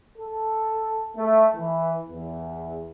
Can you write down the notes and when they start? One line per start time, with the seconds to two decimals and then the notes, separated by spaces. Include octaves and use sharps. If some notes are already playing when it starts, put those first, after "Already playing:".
0.18 A4
1.17 A3
1.55 E3
2.09 E2